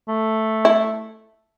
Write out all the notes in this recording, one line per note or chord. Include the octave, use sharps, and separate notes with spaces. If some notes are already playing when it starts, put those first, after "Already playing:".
A3
E4